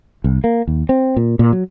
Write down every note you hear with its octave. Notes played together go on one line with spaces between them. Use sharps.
C2
A#3
D#2
C4
A#2
A#2
F#3